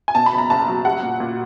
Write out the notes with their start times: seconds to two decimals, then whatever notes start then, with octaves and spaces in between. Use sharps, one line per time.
0.08 G#5
0.15 B2 A5
0.26 B5
0.33 F#1
0.38 A#5
0.50 F#1 A5
0.68 F#3
0.85 G3 F#5
1.03 A#2
1.20 A#2